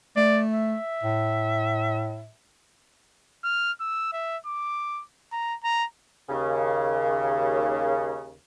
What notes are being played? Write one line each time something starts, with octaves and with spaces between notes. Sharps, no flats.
A3 D5
E5
A2
F6
E6
E5
D6
A#5
A#5
D#2 C#3